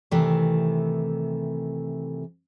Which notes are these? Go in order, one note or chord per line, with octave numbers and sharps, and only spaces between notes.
C3 D#3 E3 A3